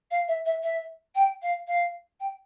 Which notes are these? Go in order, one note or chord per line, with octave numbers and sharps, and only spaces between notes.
F5
E5
E5
E5
G5
F5
F5
G5